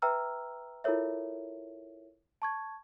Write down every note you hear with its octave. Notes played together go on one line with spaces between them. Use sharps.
B4 E5 G5 A#5 E6 F6
E4 F4 A4 A#4 C#5 E5
A5 C#6 G#6